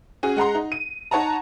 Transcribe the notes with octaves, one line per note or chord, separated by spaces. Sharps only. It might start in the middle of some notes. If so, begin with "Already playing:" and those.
C#4 F#4 G#4
G#3 F#5 A#5 C6
D#4
D#7
D#4 C#5 F#5 A5 A#5